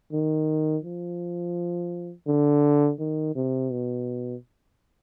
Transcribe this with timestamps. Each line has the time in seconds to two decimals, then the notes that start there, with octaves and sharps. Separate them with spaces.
0.13 D#3
0.84 F3
2.27 D3
2.99 D#3
3.35 C3
3.71 B2